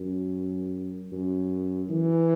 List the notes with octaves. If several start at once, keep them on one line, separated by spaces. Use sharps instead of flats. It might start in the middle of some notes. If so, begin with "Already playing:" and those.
Already playing: F#2
F#2
E3